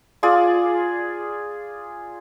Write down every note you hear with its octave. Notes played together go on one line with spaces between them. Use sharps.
F4 G#4 D5